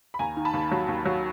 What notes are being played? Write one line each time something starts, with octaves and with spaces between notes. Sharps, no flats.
B5
D#2 G#5 A#5
D#3
A5 B5
D#2
F#3
D#2
F#3